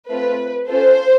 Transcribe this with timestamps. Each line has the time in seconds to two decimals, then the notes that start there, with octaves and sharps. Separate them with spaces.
0.09 A3 C4 F4 B4
0.69 C#4 F4 A4 C5